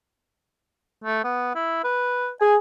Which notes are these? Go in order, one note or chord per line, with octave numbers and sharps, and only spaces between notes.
A3
B3
E4
B4
G#4 G#5